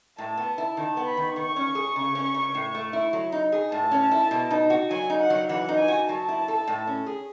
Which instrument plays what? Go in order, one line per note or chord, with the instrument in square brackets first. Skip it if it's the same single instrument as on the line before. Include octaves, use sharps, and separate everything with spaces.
[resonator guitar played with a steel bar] A2 [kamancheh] A5
[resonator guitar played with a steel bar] B3
E4
[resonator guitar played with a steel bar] D#3 [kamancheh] A5
[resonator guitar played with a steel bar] B3
[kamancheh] B5
[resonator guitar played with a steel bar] D#3
[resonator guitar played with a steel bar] D#3 [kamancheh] C#6
[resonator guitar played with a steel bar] C#4
G#4
C#3
C#4
C#3
A2
A3
E4
F#3
D#4
G#4
[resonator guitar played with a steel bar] A2 [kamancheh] A5
[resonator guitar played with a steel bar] C#4
E4
B2
D#4
F#4
[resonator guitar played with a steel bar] F#3 [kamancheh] G#5
[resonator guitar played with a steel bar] D#4
[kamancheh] F#5
[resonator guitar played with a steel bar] F#3
[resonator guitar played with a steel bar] E3 [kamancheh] F#5
[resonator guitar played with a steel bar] D#4
[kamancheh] G#5
[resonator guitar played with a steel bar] F#4
[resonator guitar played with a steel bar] F#3 [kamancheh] A5
[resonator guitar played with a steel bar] E4
A4
A2
C#4
G#4